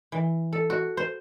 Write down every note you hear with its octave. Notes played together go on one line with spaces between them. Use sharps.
E3
A4
F#4
C5